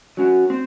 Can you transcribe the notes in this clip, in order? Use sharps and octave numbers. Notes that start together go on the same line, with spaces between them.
F#3 C#4 F#4
C4